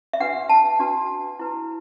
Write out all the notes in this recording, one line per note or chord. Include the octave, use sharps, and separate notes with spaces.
E5
D4 F#4 B4 F#5
A5
D4 F#4 B4
E4 B4